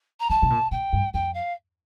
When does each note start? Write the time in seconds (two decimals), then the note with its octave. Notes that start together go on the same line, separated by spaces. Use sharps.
0.20 A#5
0.30 E3 A5
0.42 C3
0.50 A#2
0.71 A#2 G5
0.93 G2
1.13 F2 G5
1.34 F5